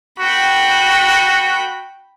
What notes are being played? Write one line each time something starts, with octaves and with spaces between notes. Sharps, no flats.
F#4 G5 B5